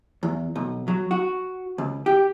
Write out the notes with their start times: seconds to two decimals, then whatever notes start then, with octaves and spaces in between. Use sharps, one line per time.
0.23 E2
0.56 B1
0.88 F#3
1.11 F#4
1.78 C#2
2.06 G4